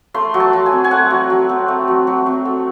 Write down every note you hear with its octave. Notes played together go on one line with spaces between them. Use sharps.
A3 C6
F#3
A5
F#3
G#5
C4
G#5
A3 F#5
F#3
F#3
C4
A3
F#3
F#3
C4
A3